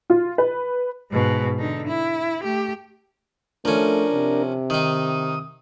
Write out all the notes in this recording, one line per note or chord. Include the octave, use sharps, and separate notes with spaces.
F4
B4
G#2 B2
D3 D#4
E4
A3 G4
F3 A3 C#4 D4 A#4
C3
D#3 D#4 D#6